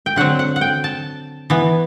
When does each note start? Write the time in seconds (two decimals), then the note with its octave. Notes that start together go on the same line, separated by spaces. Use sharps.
0.06 G5
0.16 D3 F#3 C4 F#5
0.39 F#5
0.56 F#5
0.61 G5
0.84 A5
1.50 E3 B3